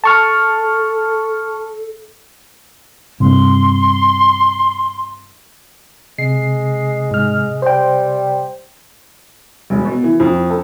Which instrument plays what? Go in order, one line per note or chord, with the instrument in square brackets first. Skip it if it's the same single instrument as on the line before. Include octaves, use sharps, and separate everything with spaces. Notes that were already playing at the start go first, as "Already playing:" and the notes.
[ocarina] A4 [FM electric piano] A5 C#6 F6
[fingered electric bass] G2 C3 [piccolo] C6
[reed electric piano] C3 [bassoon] G#3 [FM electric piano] C7
[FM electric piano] G#2 F6
[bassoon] G3 [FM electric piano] C5 G5
[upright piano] E1
B2
E3
F2
A4